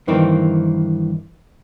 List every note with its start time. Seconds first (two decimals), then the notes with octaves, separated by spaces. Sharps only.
0.07 G2 D#3 E3 A#3 C4